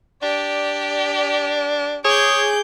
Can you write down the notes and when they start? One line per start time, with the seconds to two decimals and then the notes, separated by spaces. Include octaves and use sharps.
0.23 D4 G4 D5
2.05 G#4 C#5 D6 G6